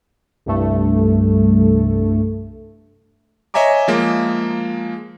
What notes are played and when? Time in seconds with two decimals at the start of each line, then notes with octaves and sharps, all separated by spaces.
0.46 C2 G2 A3
3.54 C#5 D#5 E5 G#5 A#5 D6
3.88 F3 G#3 A#3